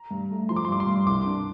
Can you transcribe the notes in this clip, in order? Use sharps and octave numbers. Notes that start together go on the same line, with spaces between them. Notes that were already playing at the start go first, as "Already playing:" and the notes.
Already playing: A#5
G2
A3
F3 C6
D6
C6
G2 D6
C6
G2
C2 D6
D4